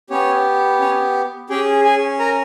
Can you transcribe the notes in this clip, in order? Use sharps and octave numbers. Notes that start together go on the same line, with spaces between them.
B3 C#4 G4 C#5
C#4 C#5
C#4 G4 G#4 G5
G#4 G#5
A#4 A#5